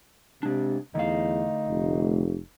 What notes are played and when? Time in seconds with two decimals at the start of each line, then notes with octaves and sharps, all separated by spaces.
0.43 C3 G#3 D4
0.95 E2 D3 A3 D#4 F5
1.69 F1